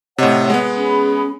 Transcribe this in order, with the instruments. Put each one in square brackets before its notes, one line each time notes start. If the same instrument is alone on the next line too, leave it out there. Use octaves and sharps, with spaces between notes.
[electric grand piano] A2 C3 [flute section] C#5 D#5 F#5
[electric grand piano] G#3 B3
[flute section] C#4 G#4 B5